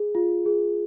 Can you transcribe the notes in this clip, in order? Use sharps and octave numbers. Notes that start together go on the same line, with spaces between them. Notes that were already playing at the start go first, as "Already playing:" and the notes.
Already playing: G#4
F4
G#4